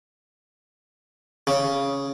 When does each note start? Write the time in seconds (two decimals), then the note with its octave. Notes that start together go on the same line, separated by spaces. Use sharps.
1.47 C#3